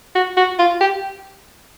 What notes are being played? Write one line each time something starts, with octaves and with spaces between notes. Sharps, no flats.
F#4
F#4
F4
G4